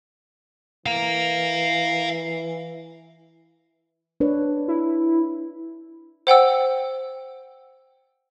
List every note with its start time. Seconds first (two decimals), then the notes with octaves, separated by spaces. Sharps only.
0.86 E3 F5 A#5
4.20 D4 B4 C#5
4.68 E4
6.27 C5 F#5 G5 E6